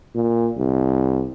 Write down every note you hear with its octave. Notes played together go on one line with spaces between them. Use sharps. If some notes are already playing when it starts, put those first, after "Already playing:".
A#2
C2